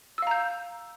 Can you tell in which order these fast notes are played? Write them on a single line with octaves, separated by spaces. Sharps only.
E6 F5 A#5 G6